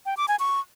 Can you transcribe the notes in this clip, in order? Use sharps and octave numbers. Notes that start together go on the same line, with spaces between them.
G5
D6
G#5
C#6